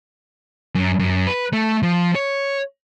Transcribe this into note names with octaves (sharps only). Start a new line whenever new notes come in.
F#2
F#2
B4
A3
F3
C#5